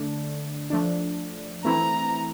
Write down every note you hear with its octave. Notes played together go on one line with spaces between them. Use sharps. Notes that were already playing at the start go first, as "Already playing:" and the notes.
Already playing: D3 A3 D4
F3 A3 D4
E3 A3 C4 E4 A#5